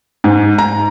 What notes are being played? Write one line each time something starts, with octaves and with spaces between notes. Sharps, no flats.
G#2
A#5